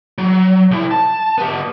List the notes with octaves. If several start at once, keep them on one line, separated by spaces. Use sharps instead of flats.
F#3
C2 E4
A5
B3 G4